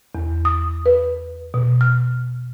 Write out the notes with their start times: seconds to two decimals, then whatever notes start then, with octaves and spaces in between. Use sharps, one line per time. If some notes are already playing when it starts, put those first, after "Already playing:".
0.15 E2
0.45 D#6
0.86 B4
1.54 B2
1.81 F6